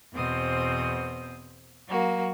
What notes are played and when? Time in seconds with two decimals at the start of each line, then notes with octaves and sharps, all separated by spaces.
0.14 E2 B2 C4 C5 D#6
1.88 F#3 A#3 F#4